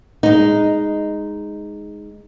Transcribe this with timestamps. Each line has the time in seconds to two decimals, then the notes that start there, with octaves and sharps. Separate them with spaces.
0.23 G#3 D#4